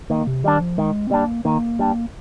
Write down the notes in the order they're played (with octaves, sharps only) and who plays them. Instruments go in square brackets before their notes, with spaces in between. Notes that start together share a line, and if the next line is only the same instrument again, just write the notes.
[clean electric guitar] D#3 [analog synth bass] A#3
[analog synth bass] C3
[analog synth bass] D#3 [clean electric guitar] G3 D4
[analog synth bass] F3
[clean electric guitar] D#3 [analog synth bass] G#3
[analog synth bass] C4
[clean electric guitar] G3 D4 [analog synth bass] A#3
[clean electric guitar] D#3 [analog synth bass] A#3
[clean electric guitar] G3 D4